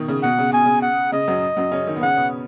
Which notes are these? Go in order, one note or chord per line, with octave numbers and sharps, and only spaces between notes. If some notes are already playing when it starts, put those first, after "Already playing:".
Already playing: B2 D#3
C#3
B2 F#5
C#3
B2 G#5
C#3
F#5
C#3 D#5
F#2 F#3
F#2 F#3
C#3 C#4
D#3 D#4
B3
C#3 C#4 F#5
B2 B3